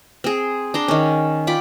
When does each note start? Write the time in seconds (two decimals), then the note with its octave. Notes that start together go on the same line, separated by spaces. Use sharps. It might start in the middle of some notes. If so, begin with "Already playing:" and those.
0.24 C4 G#4
0.74 D4 A#5 C6
0.88 D#3 C#4
1.47 F4 D5 G5 B5